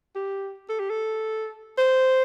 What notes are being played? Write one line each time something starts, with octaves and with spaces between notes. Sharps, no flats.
G4
A4
G4
A4
C5